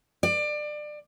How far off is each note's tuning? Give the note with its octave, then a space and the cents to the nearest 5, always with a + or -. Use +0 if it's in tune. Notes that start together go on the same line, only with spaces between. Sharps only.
D5 +25